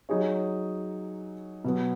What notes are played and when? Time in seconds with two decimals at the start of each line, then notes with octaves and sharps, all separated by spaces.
0.09 F#3 D#4 G#4 C#5
1.64 B2 F#3 B3